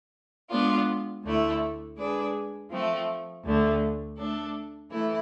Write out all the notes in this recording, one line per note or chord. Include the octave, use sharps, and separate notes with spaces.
G#3 B3 D4 F4
D2 D3 A3 E4
G#3 D4 G#4 B4 D5
F3 A3 C4
D2 D3 A3
A3 D4 A4
E3 A3 E4